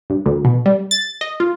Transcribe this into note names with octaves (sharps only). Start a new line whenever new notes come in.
G2
D2
B2
G3
A6
D#5
F4